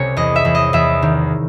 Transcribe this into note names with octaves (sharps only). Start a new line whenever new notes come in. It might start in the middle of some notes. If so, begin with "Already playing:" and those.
Already playing: C2 C3 G#4 C#5
E2 D#5
E5
E2
D#5
E2 E5
D#3